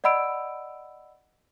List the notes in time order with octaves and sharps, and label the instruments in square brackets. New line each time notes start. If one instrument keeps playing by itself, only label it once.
[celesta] D5 D#5 F#5 B5 E6 D7